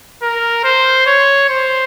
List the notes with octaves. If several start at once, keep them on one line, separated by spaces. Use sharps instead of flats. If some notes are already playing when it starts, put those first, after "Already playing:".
A#4
C5
C#5
C5